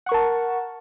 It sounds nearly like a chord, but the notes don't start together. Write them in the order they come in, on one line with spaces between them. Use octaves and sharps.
F#5 C#6 A#4 A5